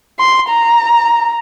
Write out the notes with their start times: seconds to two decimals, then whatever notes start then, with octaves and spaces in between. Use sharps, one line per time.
0.19 C6
0.49 A#5